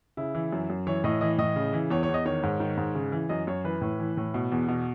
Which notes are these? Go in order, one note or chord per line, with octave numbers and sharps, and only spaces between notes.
C#3 E4
E3
F#2
F#2
E3 C#5
A2 D#5
E3 D#5
A2 D#5
C#3
E3
E2 C#5
C#5
E2 D#5
D#3 C#5
G#2
D#3
G#2
C#3
E3
F#2 D#5
F#2 C#5
E3 B4
A2
E3
A2
B2
E2
B2